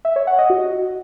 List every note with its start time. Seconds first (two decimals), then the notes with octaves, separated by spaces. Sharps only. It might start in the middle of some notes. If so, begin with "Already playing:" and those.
0.05 E5
0.16 C#5
0.27 F#5
0.38 D#5
0.50 F#4